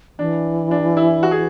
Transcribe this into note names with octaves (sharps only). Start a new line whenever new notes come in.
E3 D4
D4
E4
F#4
G#4